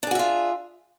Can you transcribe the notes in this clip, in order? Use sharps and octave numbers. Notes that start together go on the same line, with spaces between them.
D4 F4 F#4 G#4 E5